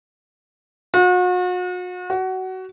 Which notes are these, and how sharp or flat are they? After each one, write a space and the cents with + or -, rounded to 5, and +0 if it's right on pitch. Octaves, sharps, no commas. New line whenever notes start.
F#4 -40
F#4 +20